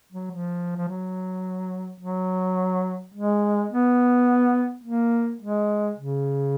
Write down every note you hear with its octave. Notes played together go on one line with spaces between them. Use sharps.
F#3
F3
F3
F#3
F#3
G#3
B3
A#3
G#3
C#3